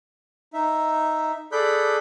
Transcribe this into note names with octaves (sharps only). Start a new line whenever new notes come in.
D#4 E5
G#4 A4 D5 B5 F#6 G6